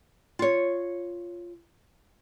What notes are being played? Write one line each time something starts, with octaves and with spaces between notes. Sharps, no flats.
F4 C#5